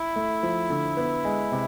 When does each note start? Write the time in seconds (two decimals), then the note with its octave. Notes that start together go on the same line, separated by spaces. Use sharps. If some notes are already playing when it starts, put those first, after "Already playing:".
Already playing: E4
0.16 A3
0.43 F3
0.70 D3
0.97 B3
1.24 G#3
1.52 C3